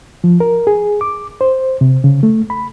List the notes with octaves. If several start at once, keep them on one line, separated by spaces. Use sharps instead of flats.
F3
A#4
G#4
D6
C5
C3
C#3
A3
B5